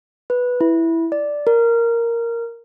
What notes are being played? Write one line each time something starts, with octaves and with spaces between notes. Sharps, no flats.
B4
E4
D5
A#4